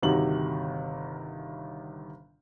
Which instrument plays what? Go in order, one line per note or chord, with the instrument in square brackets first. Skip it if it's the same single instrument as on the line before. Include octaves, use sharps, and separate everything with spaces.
[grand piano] G1 C3 D#3 F#4 F#7